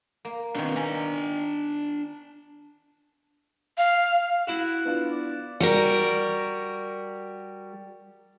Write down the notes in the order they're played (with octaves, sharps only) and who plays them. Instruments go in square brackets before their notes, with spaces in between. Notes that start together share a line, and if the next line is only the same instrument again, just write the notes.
[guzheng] A#3
[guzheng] B2 D#3 [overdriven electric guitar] C4 D4
[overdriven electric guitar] D4 G#5 [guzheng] A#5
[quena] F5
[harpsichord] E4 F#4 [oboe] F#5
[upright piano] B3 D4 F4
[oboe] D5
[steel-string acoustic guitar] G3 F#4 A#4